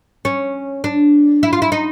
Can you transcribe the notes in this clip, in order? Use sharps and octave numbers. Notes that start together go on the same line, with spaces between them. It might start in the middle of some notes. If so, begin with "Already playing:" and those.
C#4
D4
E4
F4
E4
D#4